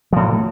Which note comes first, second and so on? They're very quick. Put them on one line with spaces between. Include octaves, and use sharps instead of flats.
F3 A2 F#3